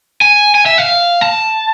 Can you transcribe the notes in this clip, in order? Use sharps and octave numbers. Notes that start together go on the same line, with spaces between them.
G#5
G#5
E5
F5
A5